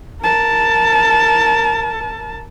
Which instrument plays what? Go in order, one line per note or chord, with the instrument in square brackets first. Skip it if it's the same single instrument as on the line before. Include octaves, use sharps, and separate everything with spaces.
[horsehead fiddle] A#4 A5